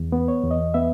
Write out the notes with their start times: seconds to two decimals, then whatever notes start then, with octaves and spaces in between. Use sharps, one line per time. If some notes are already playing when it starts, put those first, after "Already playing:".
Already playing: E2
0.12 B3
0.28 C#5
0.44 E2
0.51 D#5
0.74 B3 E5